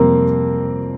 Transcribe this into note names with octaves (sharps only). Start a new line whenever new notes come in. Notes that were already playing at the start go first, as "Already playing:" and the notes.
Already playing: F2 C3 G3 A#3 C4